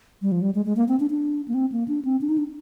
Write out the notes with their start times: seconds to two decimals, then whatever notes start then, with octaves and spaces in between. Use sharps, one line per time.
0.22 G3
0.32 F3
0.42 G3
0.55 G#3
0.65 G#3
0.76 A#3
0.88 C4
1.00 D4
1.10 D4
1.48 A#3
1.54 C4
1.72 A#3
1.88 D4
2.05 C4
2.21 D4
2.29 D#4
2.38 D4